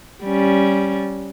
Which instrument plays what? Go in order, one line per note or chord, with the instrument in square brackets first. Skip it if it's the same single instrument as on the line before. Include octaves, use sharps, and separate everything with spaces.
[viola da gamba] G3 C#4